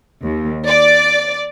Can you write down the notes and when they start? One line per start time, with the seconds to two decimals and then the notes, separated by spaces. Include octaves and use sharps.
0.23 D#2
0.66 D5